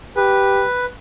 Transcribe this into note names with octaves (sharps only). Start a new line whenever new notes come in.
G4 B4